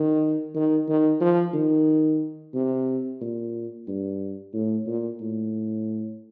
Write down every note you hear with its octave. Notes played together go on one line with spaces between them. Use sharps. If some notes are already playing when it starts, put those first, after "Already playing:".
Already playing: D#3
D#3
D#3
F3
D#3
C3
A#2
G2
A2
A#2
A2